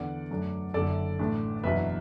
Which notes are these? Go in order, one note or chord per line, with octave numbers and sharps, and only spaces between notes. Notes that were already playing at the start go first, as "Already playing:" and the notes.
Already playing: E2 D3 B3 D4 D5 F#5
F#2 F#3 A3 D4
F#1 F#2 D3 A4 D5
A1 A2 A3 D4
F#1 E2 B2 F#3 D4 B4 E5